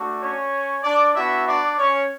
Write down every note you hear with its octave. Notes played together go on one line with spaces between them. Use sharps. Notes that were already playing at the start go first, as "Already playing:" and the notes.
Already playing: A3 D4 F#4
C#4 C#5
D4 D5
B3 D4 E4 F#4 E5
D4 D5
C#4 C#5